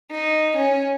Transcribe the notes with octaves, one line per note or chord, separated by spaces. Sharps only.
D#4
C#4